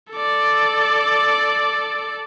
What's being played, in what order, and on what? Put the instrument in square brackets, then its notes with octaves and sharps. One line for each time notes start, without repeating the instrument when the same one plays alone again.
[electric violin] A4 D5